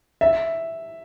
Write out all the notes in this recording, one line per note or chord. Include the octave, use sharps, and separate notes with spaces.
E5